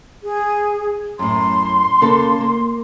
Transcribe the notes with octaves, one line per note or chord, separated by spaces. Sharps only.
G#4
F#2 A2 C6
C#3 A#3 A4
A#3